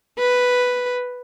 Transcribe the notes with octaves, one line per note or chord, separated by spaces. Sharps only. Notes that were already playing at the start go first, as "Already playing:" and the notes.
B4